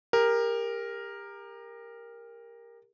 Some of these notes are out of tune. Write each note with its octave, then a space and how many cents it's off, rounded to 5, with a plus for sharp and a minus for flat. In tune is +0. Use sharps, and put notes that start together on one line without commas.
G4 +35 A#4 +0